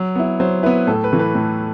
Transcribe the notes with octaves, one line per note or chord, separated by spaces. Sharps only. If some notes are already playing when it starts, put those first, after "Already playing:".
Already playing: F#3
B3 E4
F#3 C5
B3 E4 B4
A2 A4
B4
E3 A3
B4
A2